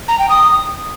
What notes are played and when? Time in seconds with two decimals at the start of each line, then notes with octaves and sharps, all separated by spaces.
0.08 A#5
0.19 G5
0.29 D#6